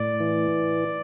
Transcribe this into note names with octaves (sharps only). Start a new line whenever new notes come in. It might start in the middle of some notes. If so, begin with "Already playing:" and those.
Already playing: A2 D5
E3